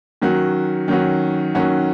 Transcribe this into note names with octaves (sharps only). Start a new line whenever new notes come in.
D#3 F#3 C#4 F#4
D#3 F#3 C#4 F#4
D#3 F#3 C#4 F#4